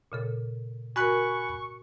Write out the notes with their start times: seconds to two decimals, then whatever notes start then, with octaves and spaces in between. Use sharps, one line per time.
0.12 A#2 C#3 A4
0.96 F#4 A#4 G#5 B5 C#6 F#6